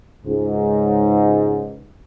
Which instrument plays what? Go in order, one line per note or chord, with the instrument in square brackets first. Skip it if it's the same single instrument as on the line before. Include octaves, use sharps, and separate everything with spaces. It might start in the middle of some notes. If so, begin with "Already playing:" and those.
[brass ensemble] C#2 G#2